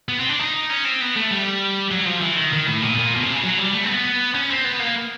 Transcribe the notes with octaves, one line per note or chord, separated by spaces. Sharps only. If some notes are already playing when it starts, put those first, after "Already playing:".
B3
C4
D4
D#4
C#4
C4
B3
A3
G3
F#3
F3
E3
D#3
D#3
A2
A#2
A#2
B2
C3
C#3
F#3
G3
A3
C4
B3
C#4
C4
B3
A#3